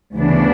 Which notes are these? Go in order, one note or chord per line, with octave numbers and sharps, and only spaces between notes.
D2 C#3 E3 B3 D4